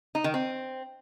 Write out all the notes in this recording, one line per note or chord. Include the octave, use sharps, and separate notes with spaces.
D#4
D#3
C4